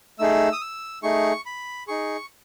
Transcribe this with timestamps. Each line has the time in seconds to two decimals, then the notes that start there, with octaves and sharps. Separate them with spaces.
0.19 A3 D#4 G#4 E6
0.52 D#6
0.61 E6
1.03 A3 D#4 G#4 C#6
1.46 B5
1.88 D#4 G#4 C#6